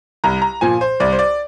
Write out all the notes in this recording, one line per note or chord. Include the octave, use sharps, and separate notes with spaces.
C2 A#5
A#5
A#2 F3 G#5
C5
C2 D5
C5
D5